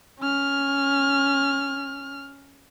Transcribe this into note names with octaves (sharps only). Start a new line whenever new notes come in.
C#4 F6